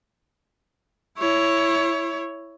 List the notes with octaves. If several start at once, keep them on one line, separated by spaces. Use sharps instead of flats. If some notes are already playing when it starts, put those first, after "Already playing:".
E4 C#5